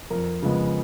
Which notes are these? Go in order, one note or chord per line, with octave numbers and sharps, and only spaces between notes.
F2 A#4
C#3 F3 G#3 B3